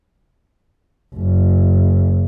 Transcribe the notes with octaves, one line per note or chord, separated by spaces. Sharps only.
F#1